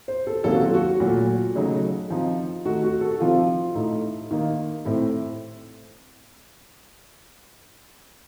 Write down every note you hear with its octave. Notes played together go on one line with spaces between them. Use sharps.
C5
A4
C3 D#3 F#3 A#3 C#4 A4
F#4
F4
F#4
A#2 F#3 A3
C#3 F#3 A3 D#4
F3 C4 D#4
D#3 A3 D#4 F#4
F#4
A4
C3 F3 C4 D#4 F4
A2 A3 D#4
D#3 A#3 D#4
A2 A3 C4